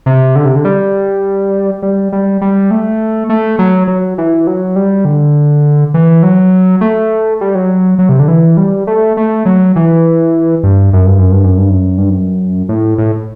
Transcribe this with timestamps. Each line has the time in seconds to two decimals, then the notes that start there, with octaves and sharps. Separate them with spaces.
0.06 C3
0.36 D3
0.45 C3
0.56 D3
0.65 G3
1.82 G3
2.12 G3
2.41 G3
2.71 A3
3.29 A3
3.59 F#3
3.87 F#3
4.18 E3
4.47 F#3
4.76 G3
5.05 D3
5.94 E3
6.23 F#3
6.81 A3
7.41 G3
7.55 F#3
7.99 F#3
8.09 C3
8.19 D3
8.28 E3
8.57 G3
8.87 A3
9.17 A3
9.46 F#3
9.76 E3
10.63 G2
10.93 F#2
11.06 G2
11.18 F#2
11.32 G2
11.44 F#2
11.58 G2
11.70 F#2
11.98 G2
12.10 F#2
12.69 A2
12.98 A2